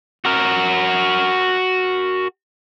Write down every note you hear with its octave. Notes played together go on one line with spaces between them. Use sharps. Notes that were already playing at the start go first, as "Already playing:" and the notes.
F#4 A#4